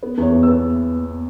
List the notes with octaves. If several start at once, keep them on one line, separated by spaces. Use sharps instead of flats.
B3 B4
E2 C#5
E2
B3 E6